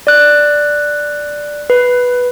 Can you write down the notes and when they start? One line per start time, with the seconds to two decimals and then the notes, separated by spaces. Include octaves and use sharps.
0.07 D5 F#6
1.70 B4